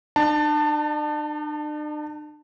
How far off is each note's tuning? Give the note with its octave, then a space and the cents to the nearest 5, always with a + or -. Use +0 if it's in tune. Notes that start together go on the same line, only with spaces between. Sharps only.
D4 +45 A5 +15